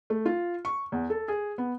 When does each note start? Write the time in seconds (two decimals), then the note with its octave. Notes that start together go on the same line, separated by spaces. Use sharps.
0.10 A3
0.26 F4
0.65 C#6
0.92 E2
1.10 A4
1.28 G#4
1.58 B3